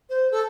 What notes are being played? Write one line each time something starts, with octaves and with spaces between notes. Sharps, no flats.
C5
A4